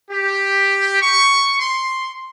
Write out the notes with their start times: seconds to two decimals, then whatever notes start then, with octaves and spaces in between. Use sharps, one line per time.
0.11 G4
1.02 C#6
1.60 C6